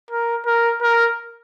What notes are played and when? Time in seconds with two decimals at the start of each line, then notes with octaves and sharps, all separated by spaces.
0.11 A#4
0.46 A#4
0.82 A#4